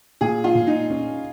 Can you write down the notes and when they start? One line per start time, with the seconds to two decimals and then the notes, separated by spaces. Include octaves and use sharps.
0.21 A#2 G#4
0.44 F4
0.55 A#2
0.67 D#4
0.90 C#4